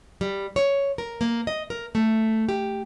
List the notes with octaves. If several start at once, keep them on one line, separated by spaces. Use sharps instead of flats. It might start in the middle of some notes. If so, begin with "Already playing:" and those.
G3
C#5
A#4
A#3
D#5
A#4
A3
G4